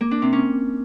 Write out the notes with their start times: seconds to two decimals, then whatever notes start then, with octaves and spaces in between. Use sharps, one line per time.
0.01 A#3
0.11 D4
0.22 C3
0.33 C#4